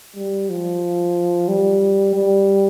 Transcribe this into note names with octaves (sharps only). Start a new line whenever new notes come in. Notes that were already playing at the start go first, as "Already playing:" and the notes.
G3
F3
G3
G3